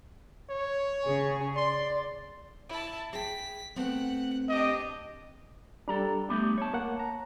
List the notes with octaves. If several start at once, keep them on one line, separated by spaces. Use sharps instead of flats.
C#5
C#3 G#4
D5 C6
E4 A5
G#4 G5 B6
A3 B3 C4 F#5
D4 G4 D#5
G3 D4 A4 A#5
A3 B3 G4
C#5 A5
A#3 F#5
A#5